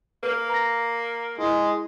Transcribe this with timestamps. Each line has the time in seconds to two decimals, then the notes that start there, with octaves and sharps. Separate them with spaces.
0.23 A#3 B4
0.50 A#5 A#6
1.38 G#3 E4